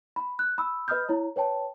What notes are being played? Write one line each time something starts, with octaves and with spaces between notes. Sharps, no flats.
B5
F#6
B5 D#6 E6
B4 D#5 B5 D#6 F6 G6
E4 C#5 A#5
B4 C#5 G5 A5